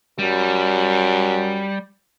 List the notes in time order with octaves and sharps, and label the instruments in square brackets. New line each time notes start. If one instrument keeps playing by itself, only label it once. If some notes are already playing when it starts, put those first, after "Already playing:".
[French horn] F#2 [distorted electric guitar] G3